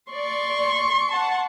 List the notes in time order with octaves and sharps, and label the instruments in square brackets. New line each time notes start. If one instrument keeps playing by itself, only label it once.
[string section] D5 [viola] C6 C#6
[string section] F#5 A5